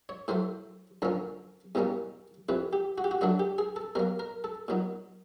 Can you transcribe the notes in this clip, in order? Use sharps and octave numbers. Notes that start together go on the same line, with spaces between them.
C#5
A2 F#3 A3 C5
F#2 D3 F3 A#3 C#4
E2 B2 G3 A#3 C#4
F2 C3 E3 B4
G4
F#4
G4
F#4
F#2 D3 F#3 A3 D4 F#4
G4
G#4
A4
B2 F#3 A#3 A#4
A#4
A4
A#2 F#3 B3 D#4